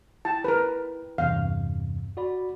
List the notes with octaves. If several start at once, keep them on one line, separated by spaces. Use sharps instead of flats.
E4 G5 A5
A#4 B4
E2 G2 C3 F5
F#4 D5 B5